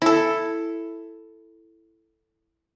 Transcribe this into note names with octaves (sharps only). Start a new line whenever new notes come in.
E4 A4